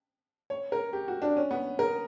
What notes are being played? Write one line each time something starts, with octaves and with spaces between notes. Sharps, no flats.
C#5
A#4
G4
F#4
D4
C#4
B3
A#4